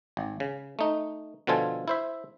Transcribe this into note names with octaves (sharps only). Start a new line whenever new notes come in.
G#1
C#3
A3 D#4
B2 D3 F3 F4 A4 G#5
E4 C5 E5